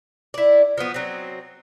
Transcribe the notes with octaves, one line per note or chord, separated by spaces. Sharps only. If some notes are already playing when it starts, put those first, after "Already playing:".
E4 D5
F3 F#3 B3
F#3 C4